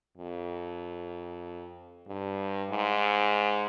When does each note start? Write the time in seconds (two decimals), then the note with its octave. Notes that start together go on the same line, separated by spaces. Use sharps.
0.18 F2
2.08 G2
2.70 G#2